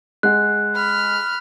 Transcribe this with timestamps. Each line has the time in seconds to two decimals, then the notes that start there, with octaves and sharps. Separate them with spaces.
0.23 G#3 F#5 F#6
0.75 B5 F6